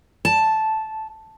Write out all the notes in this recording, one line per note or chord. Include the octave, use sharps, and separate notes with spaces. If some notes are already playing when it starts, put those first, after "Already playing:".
A5